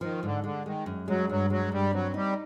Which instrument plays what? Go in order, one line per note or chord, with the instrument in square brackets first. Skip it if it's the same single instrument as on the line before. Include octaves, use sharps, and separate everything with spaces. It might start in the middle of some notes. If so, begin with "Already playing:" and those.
[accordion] D#3 [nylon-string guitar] F3
[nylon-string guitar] G#2 [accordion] D3
[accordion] D3 [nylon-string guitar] G#3
[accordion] D#3 [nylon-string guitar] G#3
[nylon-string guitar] F#2
[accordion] F#3 [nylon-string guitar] G#3
[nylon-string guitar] G2 [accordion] F#3
[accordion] F#3 [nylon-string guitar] G#3
[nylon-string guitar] G2 [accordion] G3
[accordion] F#3 [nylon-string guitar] C4
[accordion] G3 [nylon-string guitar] D#4